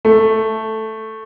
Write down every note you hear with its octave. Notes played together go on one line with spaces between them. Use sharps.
A3